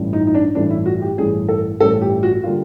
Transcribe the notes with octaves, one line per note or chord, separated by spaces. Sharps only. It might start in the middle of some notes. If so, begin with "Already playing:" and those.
Already playing: A1 G2 E3 A3 C#4
D#4
D#4
D4
A1 G2 E3 A3 C#4 D4
E4
F#4
G4
A1 G2 E3 A3 C#4 G#4
A4
A1 G2 E3 A3 C#4 A4
G4
F#4
D3 G3 A#3 F4